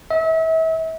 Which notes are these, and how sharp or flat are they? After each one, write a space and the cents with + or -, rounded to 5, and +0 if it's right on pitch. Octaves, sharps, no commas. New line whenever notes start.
E5 -35